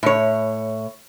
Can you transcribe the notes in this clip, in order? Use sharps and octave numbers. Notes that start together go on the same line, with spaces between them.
A2 C#5